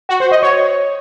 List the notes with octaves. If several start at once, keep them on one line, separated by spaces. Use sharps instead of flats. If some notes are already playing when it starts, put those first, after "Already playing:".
F#4
C5
D#5
C#5